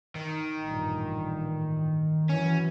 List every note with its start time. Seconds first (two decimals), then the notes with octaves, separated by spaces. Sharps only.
0.15 D#3
0.62 A1 G2 A#2
2.29 E3 F#3 C#4